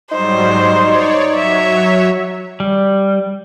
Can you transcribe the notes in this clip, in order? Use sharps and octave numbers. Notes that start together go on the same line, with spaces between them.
G#2 F#3 G3 D#4 C5
C#5 D5
F#3 C#5 E5
G3